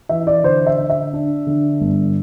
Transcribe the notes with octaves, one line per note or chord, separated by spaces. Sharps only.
E3 E5
D5
D3 C5
E5
D3
E5
D4
D3
G1